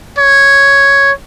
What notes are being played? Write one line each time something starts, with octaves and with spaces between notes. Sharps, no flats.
C#5